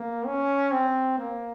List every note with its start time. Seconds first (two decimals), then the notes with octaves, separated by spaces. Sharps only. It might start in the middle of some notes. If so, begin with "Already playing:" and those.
Already playing: A#3
0.26 C#4
0.71 C4
1.18 A#3